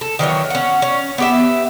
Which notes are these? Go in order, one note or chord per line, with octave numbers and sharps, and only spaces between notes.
A4
D#3 E3 F#3 C#5
C#4 F#5
C#4
B3 G4 E5